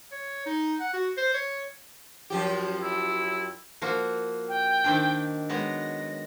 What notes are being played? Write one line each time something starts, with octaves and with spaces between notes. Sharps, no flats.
C#5
D#4
F#5
F#4
C5
C#5
F#2 F3 G4
E4
F3 A#3 F#4
G5
D#3 C4 D4
F#3 G#3 B3 A#6